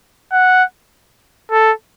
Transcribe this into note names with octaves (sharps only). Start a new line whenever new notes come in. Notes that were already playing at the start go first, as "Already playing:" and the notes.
F#5
A4